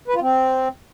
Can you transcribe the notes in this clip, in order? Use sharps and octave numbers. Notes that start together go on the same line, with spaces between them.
B4
F4
C4